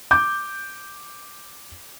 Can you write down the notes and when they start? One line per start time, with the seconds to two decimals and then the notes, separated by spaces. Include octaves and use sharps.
0.11 D6 G6